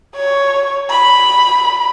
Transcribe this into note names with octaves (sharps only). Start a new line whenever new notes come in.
C#5
B5